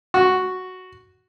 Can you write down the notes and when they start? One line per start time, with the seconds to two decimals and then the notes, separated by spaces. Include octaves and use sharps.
0.14 F#4